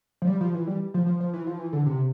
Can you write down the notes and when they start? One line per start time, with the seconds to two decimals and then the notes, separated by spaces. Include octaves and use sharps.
0.22 F3
0.27 G3
0.41 F3
0.54 E3
0.67 G3
0.94 F3
1.06 F3
1.20 F3
1.34 E3
1.47 F3
1.59 E3
1.73 D3
1.86 C3